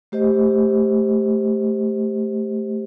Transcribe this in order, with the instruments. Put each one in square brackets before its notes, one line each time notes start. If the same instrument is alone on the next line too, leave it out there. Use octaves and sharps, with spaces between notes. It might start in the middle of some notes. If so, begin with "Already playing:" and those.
[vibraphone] A3 G4 C5 D#5